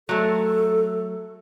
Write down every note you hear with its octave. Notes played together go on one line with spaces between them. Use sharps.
F#3 A3 A4